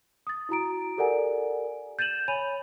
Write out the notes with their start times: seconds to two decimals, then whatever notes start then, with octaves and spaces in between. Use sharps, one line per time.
0.27 D#6 A6
0.49 E4 F#4 A#5 D7
0.97 G4 A4 A#4 D5 F#5 G#5
1.99 G6 A6 D#7 E7 F#7
2.28 C#5 G#5 B5 D#7 F7